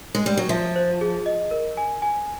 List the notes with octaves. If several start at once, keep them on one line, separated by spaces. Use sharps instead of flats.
G#3
G3
F#3
F3 E5
C5
G#4
D#5
A#4
G#5
G#5